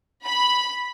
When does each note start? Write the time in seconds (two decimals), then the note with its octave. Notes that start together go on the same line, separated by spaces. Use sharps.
0.24 B5